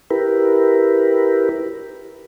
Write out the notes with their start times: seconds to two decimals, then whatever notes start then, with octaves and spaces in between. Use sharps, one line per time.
0.11 E4 G4 A#4 B4